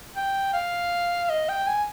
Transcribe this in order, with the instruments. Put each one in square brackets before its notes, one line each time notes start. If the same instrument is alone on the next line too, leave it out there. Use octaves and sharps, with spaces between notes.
[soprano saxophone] G5
F5
D#5
G5
G#5